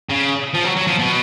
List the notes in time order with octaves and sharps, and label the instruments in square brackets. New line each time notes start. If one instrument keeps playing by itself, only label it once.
[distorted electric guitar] C#3
F3
F#3
F#3
F3
B2